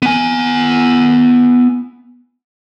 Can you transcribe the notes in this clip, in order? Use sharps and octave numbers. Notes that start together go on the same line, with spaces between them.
B3 G#5